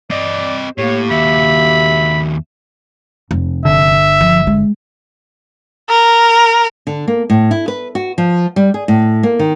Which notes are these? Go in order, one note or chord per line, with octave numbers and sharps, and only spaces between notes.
C4 D5 D#5
A2 A#3 G4 C#5
D#2 F#4 E5 B5
F1
G1 D3 E5
F3
G#3
A#4
D3
A#3
A2
E4
B4
F#4
F3
G3
G#4
A2
A#3
D#3